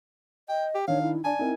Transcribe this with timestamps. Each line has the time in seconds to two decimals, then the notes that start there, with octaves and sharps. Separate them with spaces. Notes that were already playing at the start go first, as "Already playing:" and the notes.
0.49 D#5 G5
0.75 G4
0.88 D#3 D4 C#5 F5
1.02 E4
1.25 D4 D5 G#5 A5
1.39 C4 D#4 E4 A#4